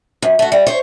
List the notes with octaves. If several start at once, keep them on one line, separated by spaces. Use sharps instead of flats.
F#2
A3 F#4
G3
C5 C#5